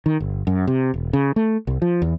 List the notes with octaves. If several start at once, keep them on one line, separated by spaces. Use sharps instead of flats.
D#3
G1
F#2
C3
E1
C#3
A3
C2
F3
E2